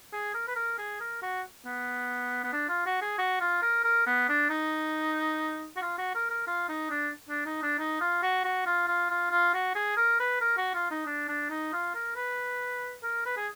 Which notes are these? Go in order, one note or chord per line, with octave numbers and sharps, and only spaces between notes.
G#4
A#4
B4
A#4
G#4
A#4
F#4
B3
B3
D4
F4
F#4
G#4
F#4
F4
A#4
A#4
B3
D4
D#4
F#4
F4
F#4
A#4
A#4
F4
D#4
D4
D4
D#4
D4
D#4
F4
F#4
F#4
F4
F4
F4
F4
F#4
G#4
A#4
B4
A#4
F#4
F4
D#4
D4
D4
D#4
F4
A#4
B4
A#4
B4
G#4